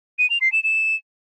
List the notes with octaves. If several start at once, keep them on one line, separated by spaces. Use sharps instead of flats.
D#7
F7
C7
E7
E7